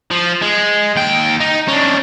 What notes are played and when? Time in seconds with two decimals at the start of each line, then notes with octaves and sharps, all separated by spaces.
0.11 F3
0.42 G#3
0.96 D#2 G5
1.40 D#4
1.68 C#4 D4